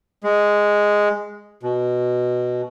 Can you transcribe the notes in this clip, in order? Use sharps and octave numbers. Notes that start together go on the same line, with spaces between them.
G#3
B2